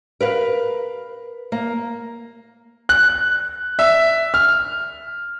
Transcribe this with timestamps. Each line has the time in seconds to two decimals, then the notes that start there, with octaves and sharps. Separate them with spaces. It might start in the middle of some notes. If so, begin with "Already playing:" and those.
0.20 A#4 B4 F5
1.52 A#3
2.89 F#6
3.79 E5
4.34 F6